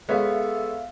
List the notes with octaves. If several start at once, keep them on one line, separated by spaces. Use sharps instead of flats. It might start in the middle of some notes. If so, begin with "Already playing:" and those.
G#3 B3 A4 C#5 E5 F5 B6